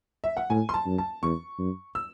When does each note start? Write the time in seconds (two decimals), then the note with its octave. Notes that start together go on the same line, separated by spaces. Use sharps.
0.24 E5
0.37 F#5
0.50 A2 G#5
0.69 C6
0.74 A5
0.86 F#2
0.98 A5
1.22 E2 C#6
1.59 F#2
1.95 E6